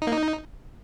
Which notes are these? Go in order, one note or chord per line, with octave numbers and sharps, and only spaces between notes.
D#4
A#3
D#4